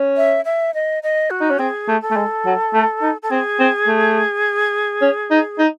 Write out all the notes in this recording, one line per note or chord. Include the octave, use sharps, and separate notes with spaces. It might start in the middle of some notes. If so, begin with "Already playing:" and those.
Already playing: C#4
E5
E5
D#5
D#5
F#4
D#4
C#4
C4 G#4
A3
A4
A3
G#3
F#3
A3
D#4
A4
C4 G#4
C4
A3
C#4
D#4
D#4